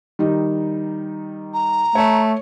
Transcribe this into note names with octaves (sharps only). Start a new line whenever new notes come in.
D#3 G3 D#4
A#5
A3 C#5